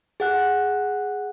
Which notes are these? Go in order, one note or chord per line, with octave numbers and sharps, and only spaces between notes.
G#4 F#5 F#6